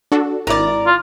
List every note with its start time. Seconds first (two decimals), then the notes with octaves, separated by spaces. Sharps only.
0.12 D4 F#4 A4
0.47 G#1 E4 A#4 D5 A6
0.87 F4